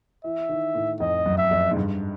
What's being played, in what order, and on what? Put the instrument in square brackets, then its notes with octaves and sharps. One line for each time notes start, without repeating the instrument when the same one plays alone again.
[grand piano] E3 [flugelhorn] E5
[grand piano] D#3
A2
[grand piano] F2 [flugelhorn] D#5
[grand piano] F#2
[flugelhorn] E5
[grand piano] F2
G#2
G2